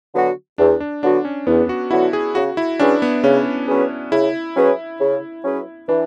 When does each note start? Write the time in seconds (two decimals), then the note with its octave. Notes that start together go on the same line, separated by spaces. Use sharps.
0.14 D3 F#3 B3 F#4
0.58 E2 D4
0.80 D4
1.03 D3 F#3 B3 D4 F#4
1.25 C#4
1.47 E2 B3
1.69 F#4
1.91 D3 F#3 B3 E4 F#4
2.13 G#4
2.35 C#3 F#4
2.57 E4
2.79 F#3 C#4 D4 G#4 B4
3.02 B3
3.24 C#3 C#4
3.68 F#3 C#4 G#4 B4
4.12 C#3 E4
4.56 F#3 C#4 G#4 B4
5.00 C#3
5.44 F#3 C#4 G#4 B4
5.88 E3 D4